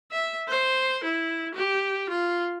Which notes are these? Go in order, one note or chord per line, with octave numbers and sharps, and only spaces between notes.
E5
C5
E4
G4
F4